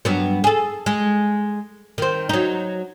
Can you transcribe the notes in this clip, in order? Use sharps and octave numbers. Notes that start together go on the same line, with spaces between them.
G2 F#3 B3
G#4 A4
G#3
D#3 C4
F#3 D#4